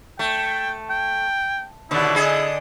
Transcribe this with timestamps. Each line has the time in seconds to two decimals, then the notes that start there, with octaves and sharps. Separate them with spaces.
0.19 A3 G5
0.90 G5
1.91 D#2 B2 D3 E4
2.15 D3 G#4 D#5